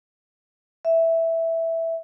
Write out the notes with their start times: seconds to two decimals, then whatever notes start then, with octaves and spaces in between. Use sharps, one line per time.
0.85 E5